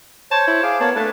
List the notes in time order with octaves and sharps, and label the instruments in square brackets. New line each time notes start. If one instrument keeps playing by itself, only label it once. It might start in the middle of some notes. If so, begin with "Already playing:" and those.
[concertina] C5 C#5 [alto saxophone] A5
[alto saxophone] E4
[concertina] G#4 D6 [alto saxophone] F5
[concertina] A#3 C#5 A5 [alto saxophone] B3
[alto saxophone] A3 [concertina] D4 B4 A5